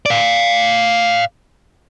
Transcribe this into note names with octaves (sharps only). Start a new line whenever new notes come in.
D5 F5